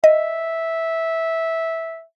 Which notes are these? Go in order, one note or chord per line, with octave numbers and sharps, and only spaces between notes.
D#5 E5